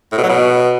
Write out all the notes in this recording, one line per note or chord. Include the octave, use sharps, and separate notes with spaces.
A2
B2
F#3
B2